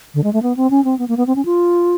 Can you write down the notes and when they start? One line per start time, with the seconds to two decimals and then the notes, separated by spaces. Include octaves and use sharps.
0.14 D3
0.24 G#3
0.33 A3
0.42 B3
0.56 C4
0.70 C#4
0.84 C4
0.98 B3
1.08 A#3
1.17 B3
1.27 C4
1.36 C#4
1.45 F4